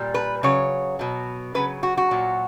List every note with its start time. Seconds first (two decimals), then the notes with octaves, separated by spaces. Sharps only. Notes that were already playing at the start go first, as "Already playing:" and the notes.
Already playing: A#2 G3
0.14 B4
0.43 C#3 F#3 C#5
0.99 B2 F#3
1.55 C#3 F#3 B4
1.83 F#4
1.97 F#4
2.11 A#2 F#3